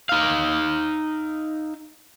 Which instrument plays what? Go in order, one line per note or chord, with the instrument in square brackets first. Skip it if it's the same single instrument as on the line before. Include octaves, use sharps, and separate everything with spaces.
[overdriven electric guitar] D#4 F5